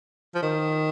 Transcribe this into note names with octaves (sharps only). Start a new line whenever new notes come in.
F3
D#3